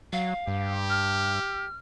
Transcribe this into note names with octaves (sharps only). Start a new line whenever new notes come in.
F#3 F5
G2 G4
F6